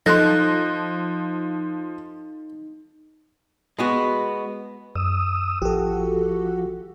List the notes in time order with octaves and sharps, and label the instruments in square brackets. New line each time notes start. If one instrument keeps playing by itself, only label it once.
[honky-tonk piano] F3 [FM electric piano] D#4 [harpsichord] A4 [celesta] C6 F#6 A#6
[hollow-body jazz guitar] G#3 B3 F#4
[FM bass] F#2 [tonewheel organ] D#6 E6
[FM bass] A1 [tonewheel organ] F3 [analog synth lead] F#4 [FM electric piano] G4 A4